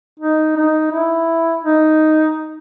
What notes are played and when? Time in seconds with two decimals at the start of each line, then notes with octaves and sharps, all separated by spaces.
0.20 D#4
0.57 D#4
0.92 E4
1.64 D#4